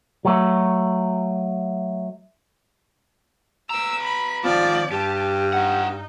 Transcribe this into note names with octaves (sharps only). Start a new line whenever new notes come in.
F#3 A3
B4 A#5 E6
B5
D#3 F3 C4 D5
G2 G4 A5
D#4 G4 F#5